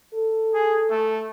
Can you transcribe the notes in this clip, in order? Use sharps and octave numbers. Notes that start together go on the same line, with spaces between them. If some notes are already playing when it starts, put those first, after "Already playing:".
A4
G#4
A3